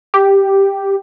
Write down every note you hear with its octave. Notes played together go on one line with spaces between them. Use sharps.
G4